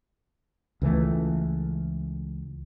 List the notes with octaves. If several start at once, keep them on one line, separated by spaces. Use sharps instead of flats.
C#2 E3 A3